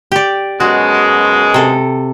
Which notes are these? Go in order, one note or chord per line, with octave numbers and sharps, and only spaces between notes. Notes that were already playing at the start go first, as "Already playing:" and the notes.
G4 D5
F#2 B2 G#3 F#4
C3 A4